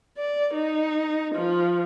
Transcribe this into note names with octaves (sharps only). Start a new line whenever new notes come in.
D5
D#4
F3